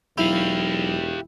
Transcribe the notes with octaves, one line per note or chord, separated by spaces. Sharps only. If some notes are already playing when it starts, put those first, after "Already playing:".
E1 F#3 D#4 E4 G4 F5